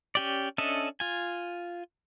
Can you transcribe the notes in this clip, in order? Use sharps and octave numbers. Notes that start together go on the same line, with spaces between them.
C#4 G4 D5
C#4 D4 A4 D#5 E5
F4 G#5